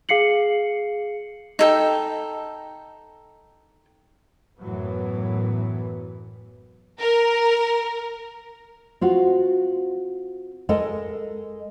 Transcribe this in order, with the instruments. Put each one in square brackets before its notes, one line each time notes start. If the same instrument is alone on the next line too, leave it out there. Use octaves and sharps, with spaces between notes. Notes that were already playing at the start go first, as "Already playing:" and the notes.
[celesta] G#4 F5 C7 C#7 F#7
[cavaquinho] D#4 A4 G5
[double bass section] F#2 A2 E3 F#3 B3
[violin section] A#4
[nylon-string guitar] C4 F4 F#4
G#3 A4 A#4 D#5